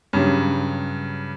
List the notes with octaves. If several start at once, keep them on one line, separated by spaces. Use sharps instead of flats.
G2 C#3 F#3